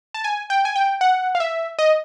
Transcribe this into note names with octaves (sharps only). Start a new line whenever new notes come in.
A5
G#5
G5
G#5
G5
F#5
F5
E5
D#5